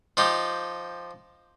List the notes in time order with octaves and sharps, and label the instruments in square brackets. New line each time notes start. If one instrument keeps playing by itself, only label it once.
[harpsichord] F3 D#4 G4